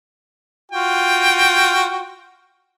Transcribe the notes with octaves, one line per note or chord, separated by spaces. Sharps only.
F4 F#4 G5